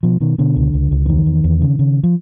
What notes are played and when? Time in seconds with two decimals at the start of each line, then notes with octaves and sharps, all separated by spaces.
0.03 B2 F3
0.21 B2 D#3
0.38 B2 D3
0.56 C#2
0.74 C#2
0.91 C#2
1.06 D3
1.09 E2 D#3
1.26 E2
1.44 E2
1.62 C#3
1.79 C#3
2.03 F3